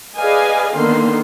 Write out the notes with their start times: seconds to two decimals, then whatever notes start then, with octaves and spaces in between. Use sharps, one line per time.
0.18 G#4 B4 D5 D#5 F5 G#5
0.75 D3 D#3 A#3 B3 C6